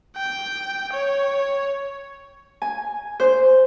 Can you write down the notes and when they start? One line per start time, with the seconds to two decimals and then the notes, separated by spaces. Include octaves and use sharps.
0.16 G5
0.93 C#5
2.62 G#5
3.20 C5